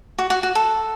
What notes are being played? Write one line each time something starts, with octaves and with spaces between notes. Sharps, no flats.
F#4
F#4
F#4
A4